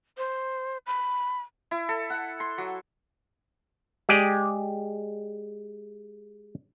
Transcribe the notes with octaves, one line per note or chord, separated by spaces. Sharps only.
C5
B5
E4
A4
F#5
C6
F#3
G#3 G4 G#4 D5 G5